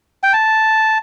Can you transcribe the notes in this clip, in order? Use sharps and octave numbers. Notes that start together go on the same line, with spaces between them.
G5
A5